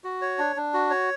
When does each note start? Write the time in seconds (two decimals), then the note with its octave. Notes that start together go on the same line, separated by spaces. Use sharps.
0.04 F#4
0.22 C#5
0.38 D4
0.56 D4
0.74 F#4
0.90 C#5